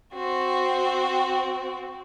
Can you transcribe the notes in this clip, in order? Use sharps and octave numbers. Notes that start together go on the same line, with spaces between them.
C4 F#4